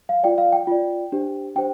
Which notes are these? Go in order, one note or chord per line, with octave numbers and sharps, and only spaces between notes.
F5
F4 D5 G5
F5
G5
F4 D5
D4 G4 C5
D4 G4 C5 G5